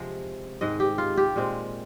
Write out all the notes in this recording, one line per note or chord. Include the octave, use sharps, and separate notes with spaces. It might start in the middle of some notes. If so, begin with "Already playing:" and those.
Already playing: C3 F3 G#3
G#2 D#3 G#3 D#5
G4
F4
G4
A#2 G#3 C4